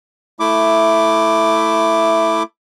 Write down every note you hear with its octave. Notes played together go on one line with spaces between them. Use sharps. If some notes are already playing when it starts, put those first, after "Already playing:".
A3 E4 D6